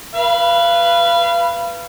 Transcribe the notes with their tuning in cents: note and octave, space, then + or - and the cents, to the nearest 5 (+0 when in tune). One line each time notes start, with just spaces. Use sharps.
B4 -5 F5 -30